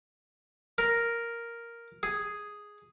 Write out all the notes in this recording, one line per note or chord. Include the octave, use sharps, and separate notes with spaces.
A#4
G#4